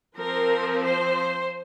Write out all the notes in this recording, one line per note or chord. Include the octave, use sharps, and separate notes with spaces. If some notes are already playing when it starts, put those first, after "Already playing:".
F3 C4 A#4
C5